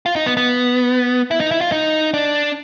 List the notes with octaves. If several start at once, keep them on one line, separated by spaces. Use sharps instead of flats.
F4
D#4
B3
B3
E4
D#4
E4
F4
D#4
D4